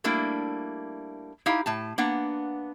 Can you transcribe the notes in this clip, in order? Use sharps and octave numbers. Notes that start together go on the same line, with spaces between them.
G3 A3 A#3 D4 E4
D#4 E4 G4 F5
A2 A5
A#3 B3 D4 F#5